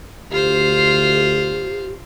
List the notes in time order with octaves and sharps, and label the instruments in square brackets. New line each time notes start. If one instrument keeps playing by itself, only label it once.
[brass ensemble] D2 [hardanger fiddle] F4 C5 [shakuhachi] G4